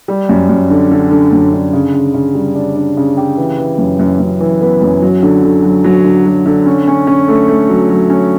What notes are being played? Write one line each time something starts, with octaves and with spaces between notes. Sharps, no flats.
G3
F#2
F#2
D3
D3
D3
F#2
D3
C#3
C#3
C#3
G3
D4
D4
C#3
G4
E3
E3
F#2
F#2
F#2
E3
B3
F#2
F#3
D3
D3
F#3
F#3
D3
F#3
D3
C#4
C#4
C#4
A3
A3
F#3
F#3
C#4